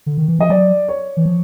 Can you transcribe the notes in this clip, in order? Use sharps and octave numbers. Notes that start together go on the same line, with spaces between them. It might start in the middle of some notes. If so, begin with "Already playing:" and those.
D3
D#3
E3
F3 D#5
F#3 D5
C#5
E3
F3